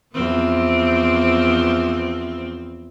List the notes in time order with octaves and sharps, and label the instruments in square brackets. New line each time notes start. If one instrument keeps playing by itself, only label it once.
[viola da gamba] E2 F3 C4